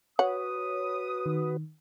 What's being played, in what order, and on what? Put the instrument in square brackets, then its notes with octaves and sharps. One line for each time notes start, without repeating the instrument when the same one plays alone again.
[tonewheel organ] F#4 B4 [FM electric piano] C#5 [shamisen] F#5 [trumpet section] D#6
[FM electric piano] D#3